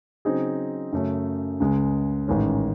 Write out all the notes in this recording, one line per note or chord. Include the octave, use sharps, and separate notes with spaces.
C#3 F#3 C4 D#4 G#4
F#2 C#3 F#3 A3 C#4
C#2 C#3 G#3
A1 G#2 D#3 G#3 C#4